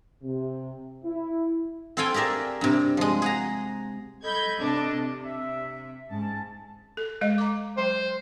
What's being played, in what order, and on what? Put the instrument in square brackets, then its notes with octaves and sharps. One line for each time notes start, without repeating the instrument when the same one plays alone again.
[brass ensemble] C3
E4
[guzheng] C4 A4 F5 G5 G#5
G4 G#4 A#4 D5 E5
G2 C3
F3 G#3
G#4 F#5 A#5
[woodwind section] A4 D#5 [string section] B5 G6 G#6
[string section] C3 D4
C3
[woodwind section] E5
[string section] G#2 [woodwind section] C#4 A5
[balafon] A4
G#3 D#5
A#5 D6
[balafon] F#3 [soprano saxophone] C5